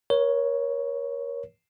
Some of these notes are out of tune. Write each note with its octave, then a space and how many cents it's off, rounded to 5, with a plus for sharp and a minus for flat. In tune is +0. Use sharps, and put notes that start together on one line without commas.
A#4 +35 C#5 +0